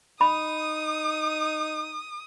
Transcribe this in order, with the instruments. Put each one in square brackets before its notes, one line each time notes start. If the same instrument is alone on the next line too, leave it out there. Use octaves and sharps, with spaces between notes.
[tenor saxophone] D#4 [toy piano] B5 [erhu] D#6